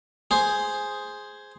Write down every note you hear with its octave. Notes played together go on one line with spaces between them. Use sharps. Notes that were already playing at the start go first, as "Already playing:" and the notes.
G#4 C5